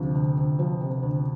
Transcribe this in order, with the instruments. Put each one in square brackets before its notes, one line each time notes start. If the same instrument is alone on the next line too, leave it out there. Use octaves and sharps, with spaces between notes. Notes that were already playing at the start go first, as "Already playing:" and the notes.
Already playing: [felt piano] D2 C3 F3
D2
D2
F3
C3
D2